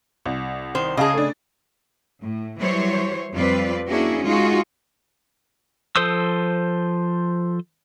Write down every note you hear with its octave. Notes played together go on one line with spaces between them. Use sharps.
C2
D#3 C5
C#3 G#4 D#5 F5 A5
A3 D4
A2
E3 F#3 G3 C5 C#5
F2 G3 C4 F4 B4 D5
A#3 C#4 D4 E4 F#4 G#4
G#3 D#4 F4 F#4 G#4
F3 A4 C5 D#6 E6